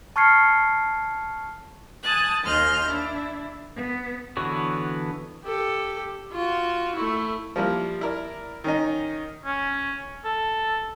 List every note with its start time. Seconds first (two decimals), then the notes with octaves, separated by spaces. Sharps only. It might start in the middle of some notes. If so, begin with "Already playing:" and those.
0.16 A5 C#6 F6 G#6 C7 C#7
2.03 G#5 A5 D#6 F#6 A6
2.44 D#2 D#5 C6 F6 G6
2.87 D4 E4
3.75 B3
4.37 D3 E3 B3 F#4 C#5
5.44 G4 A4
6.33 F4 F#4
6.95 A3 E4
7.56 F3 G3 A#3 E4
8.01 E4 A#4 D5
8.64 D#3 C#4 D#4
9.46 C#4
10.25 A4